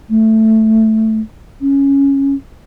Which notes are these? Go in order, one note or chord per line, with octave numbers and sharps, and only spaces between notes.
A3
C#4